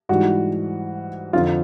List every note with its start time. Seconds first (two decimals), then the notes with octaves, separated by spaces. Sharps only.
0.09 G#2 E3 G3 F#4
1.33 F2 D3 F3 F4